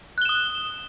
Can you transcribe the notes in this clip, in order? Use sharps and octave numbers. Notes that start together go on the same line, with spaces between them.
D#6 F#6 E7 G7